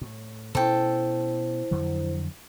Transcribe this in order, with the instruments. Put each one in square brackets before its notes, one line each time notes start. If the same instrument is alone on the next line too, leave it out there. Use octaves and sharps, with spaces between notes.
[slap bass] A2
[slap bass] B2 C#4 [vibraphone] E4 C5 [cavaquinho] A4 G5
[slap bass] F2 D3 F#3